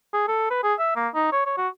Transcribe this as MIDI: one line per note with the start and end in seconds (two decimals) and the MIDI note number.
0.14 0.25 68
0.28 0.51 69
0.51 0.62 71
0.63 0.74 68
0.79 0.92 76
0.96 1.08 58
1.15 1.31 63
1.32 1.44 73
1.46 1.57 73
1.58 1.68 66